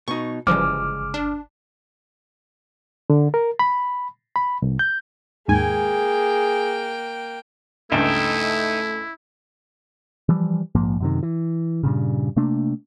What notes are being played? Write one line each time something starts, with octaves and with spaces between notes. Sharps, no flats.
B2 D#4 C#6
G1 C#3 E3 F3 G3 G#3 D6 F6
D4
D3
A#4
B5
B5
C2
G6
D#2 G#2 A#3 G#4 G5 G#5
C#2 G2 A3 D#4 E4 E5 G5
E3 F3 G3
A#1 G#2 F3 A#3
F#2 C3 D#3
E3
G2 A#2 C#3
C3 A3 A#3 D4